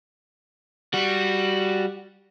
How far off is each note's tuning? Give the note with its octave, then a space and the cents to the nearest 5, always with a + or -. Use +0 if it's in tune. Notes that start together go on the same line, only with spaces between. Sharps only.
G3 +0 F#4 +0